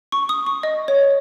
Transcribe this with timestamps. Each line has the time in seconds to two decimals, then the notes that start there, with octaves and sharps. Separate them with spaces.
0.12 C#6
0.29 D#6
0.46 C#6
0.63 D#5
0.88 C#5